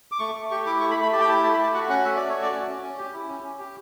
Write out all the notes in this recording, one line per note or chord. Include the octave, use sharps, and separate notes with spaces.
D6
A3 C#6
A3
G4 C#6
E4 D6
A3 C#6
B5
A3
B5
G4 A5
G5
E4 A5
A3 A5
B5
A3
A5
F#4 F#5
C#4 F#5
A3 E5
A3 D5
C#5
F#4
D5
C#4
C#4
C#4
G4
E4
C#4
C#4
G4